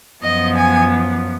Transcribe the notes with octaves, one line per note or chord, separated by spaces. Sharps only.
F#2 F3 B3 D#5
G#5